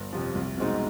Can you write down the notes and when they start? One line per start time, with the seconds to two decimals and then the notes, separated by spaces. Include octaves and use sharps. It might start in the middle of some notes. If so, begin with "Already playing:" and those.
Already playing: G1
0.13 F2 C3 F3
0.35 C2
0.57 B2 G#3 C4 D#4